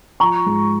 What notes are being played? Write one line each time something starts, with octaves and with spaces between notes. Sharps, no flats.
F3 A#5 C#6
G#2